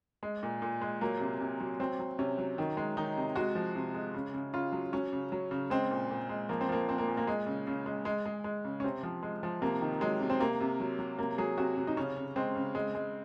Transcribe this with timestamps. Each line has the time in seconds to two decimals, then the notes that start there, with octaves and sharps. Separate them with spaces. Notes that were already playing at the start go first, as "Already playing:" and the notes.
0.23 G#3
0.43 A#2
0.62 A#2
0.81 G#3
1.01 F#3 A#3
1.21 C3
1.41 C3
1.60 F#3
1.79 F#3 C4
1.99 F#3
2.19 C3 C#4
2.38 F#3
2.58 D#3
2.77 G#3
2.97 D#3 D#4
3.17 C3
3.36 G#3 F#4
3.55 F3
3.75 C3
3.94 G#3
4.14 C#3
4.34 C#3
4.53 C#3 F4
4.72 F#3
4.93 F#3 C#4
5.13 C#3
5.32 F#3
5.51 C#3
5.70 G#3 C4
5.91 A#2
6.10 A#2
6.29 G#3
6.49 F3 A#3
6.61 C4
6.69 F3 A#3
6.88 A#2 C4
6.98 A#3
7.08 A#2
7.17 A#3
7.27 G#3
7.46 C#3
7.67 C#3
7.86 G#3
8.05 G#3
8.26 G#3
8.44 G#3
8.65 C#3
8.80 C#4
8.84 C3 C4
9.03 F3
9.23 G#3
9.43 F3
9.62 C3 A#3
9.81 D#3
10.01 F#3 G#3
10.21 C3
10.30 C4
10.40 C3 A#3
10.60 C3
10.80 F#3
10.99 F#3
11.18 C3 A#3
11.38 F#3 G#4
11.58 C3 F#4
11.77 C3
11.87 D#4
11.97 C#3 C#4
12.17 C#3
12.36 G#3 C4
12.55 C#3
12.75 G#3
12.95 G#3